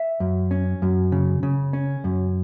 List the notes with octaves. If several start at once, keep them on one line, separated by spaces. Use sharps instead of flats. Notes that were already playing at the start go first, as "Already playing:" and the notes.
Already playing: E5
F#2
C#4
F#2
C#3
C#3
C#4
F#2